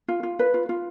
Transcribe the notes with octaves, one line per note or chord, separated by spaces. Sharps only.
F4
F4
B4
F4
F4